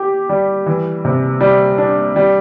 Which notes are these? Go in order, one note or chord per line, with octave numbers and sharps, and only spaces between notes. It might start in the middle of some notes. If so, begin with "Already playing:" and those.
Already playing: G4
G3
E3
C3
G3
D4
G3